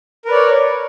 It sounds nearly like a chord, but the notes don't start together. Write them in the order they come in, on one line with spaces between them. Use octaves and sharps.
A#4 B4 D5 C#5